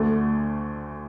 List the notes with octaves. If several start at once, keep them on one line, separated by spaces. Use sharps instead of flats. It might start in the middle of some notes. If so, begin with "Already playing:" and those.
Already playing: D2 D3 A3